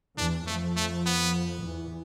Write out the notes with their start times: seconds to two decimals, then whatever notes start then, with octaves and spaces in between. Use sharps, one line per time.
0.17 E2 E3 D4
0.46 F2 F3 A3
0.76 A3
1.06 B3
1.63 E2 E3